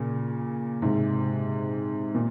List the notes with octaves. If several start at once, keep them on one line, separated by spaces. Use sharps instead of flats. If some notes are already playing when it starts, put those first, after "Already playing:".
Already playing: A#2 C#3
G#2 C3
A#2